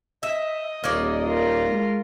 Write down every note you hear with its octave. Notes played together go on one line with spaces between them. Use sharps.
D#5 E5
D#1 A#3 C#5 D5
F4 A#4
G#3